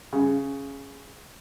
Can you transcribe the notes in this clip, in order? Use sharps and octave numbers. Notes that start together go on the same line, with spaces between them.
C#3